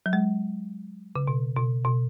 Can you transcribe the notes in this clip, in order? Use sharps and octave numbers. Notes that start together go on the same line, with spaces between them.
F#3
G#3
C#3
B2
B2
B2